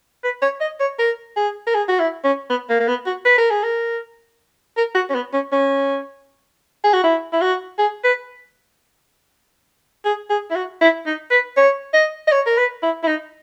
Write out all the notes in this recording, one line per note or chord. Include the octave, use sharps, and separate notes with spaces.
B4
C#5
D#5
C#5
A#4
G#4
A#4
G#4
F#4
E4
C#4
B3
A#3
A#3
B3
F#4
B4
A#4
G#4
A#4
A#4
F#4
C#4
B3
C#4
C#4
G#4
F#4
E4
E4
F#4
G#4
B4
G#4
G#4
E4
F#4
E4
D#4
B4
C#5
D#5
D#5
C#5
A#4
B4
E4
E4
D#4